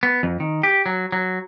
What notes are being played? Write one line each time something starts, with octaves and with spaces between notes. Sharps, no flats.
B3
F2
D#3
G4
F#3
F#3